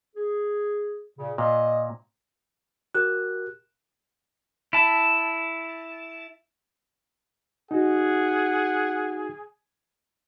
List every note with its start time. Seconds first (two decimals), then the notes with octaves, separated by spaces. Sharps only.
0.16 G#4
1.19 A#2 C#3
1.38 A#2 D#5
2.95 F#4 G4 A#4 F#6
4.73 E4 A5
7.71 D#4 F#4 G#4 F#5